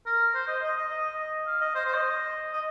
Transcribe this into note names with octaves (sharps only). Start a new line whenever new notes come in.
A#4
C5
D#5
D#5
D#5
D#5
F5
D#5
C5
C5
D#5
D#5